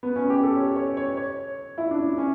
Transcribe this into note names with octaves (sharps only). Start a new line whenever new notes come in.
B3
C#4
G4
A4
C#5
C#5
C#5
C#5
E4
D4
D4
C#4